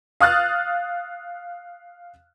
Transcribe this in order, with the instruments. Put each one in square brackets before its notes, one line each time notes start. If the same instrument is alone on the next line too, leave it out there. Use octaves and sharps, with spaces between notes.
[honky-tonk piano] F5 D#6 F6 F#6 A6